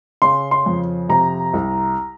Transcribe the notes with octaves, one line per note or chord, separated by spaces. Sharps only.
C#3 C6
C6
F2
C3 A#5
C2